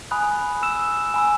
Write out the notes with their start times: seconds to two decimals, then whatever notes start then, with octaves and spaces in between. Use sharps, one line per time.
0.11 G#5 B5 D#6 F#6
0.63 E6 E7
1.14 G#5 B5 E6